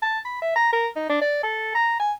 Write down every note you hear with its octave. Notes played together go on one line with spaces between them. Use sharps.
A5
B5
E5
A#5
A#4
D#4
D4
D5
A4
A#5
G#5